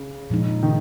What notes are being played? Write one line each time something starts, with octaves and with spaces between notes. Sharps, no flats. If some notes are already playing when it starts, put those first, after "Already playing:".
Already playing: C#3
A#2 F3 G#3 D#4
D#3